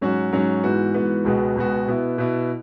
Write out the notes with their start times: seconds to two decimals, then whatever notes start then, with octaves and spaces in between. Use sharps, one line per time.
0.01 G#2 F#3 C#4 F#4
0.32 G#2 F#3 C#4 F#4
0.64 G#2 E3 B3 F#4
0.94 G#2 E3 B3 F#4
1.24 C#2 B2 G#3 B3 F#4
1.55 C#2 B2 G#3 B3 F#4
1.87 B2 B3 E4
2.18 B2 B3 E4